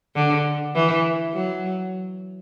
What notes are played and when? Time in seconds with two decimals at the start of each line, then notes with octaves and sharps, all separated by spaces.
0.15 D3
0.74 E3
1.33 F#3